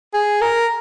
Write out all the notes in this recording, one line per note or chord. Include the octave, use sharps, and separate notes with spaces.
G#4
A#4